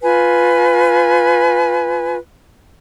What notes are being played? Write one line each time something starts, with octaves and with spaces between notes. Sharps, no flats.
F4 B4 G#5